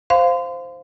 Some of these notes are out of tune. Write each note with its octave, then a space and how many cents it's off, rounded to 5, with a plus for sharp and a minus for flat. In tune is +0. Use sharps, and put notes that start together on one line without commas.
C5 +0 F5 +0 C6 -35